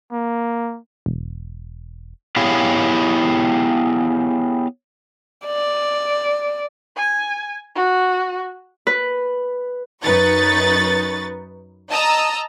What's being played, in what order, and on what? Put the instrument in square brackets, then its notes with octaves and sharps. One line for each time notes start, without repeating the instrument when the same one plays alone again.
[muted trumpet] A#3
[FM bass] E1
[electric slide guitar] B3 E4 G4 G#4 C#5 F5
[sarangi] D5
[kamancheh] G#5
F#4
[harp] B4
[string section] F#2 D#4 B4 C#6 A6
D#5 A5 A#5 D#6 E6